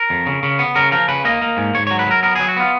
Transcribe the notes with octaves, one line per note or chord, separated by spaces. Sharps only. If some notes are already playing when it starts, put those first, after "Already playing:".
Already playing: A#4
F2
C#3
C#3
B3
C#3 A#4
F3 A#4
C#3 B4
A#3 D#5
A#3
G#2
G#2 C#5
F#3 C#5
B4
F#3 A#4
B3 A#4
F#3 G#4
F#4
B3 F4